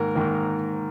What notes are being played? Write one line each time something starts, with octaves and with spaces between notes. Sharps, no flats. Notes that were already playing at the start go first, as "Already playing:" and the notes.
Already playing: G#2 D#3 A#3 A#4
G#2 D#3 A#3